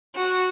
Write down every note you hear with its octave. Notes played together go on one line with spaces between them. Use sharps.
F#4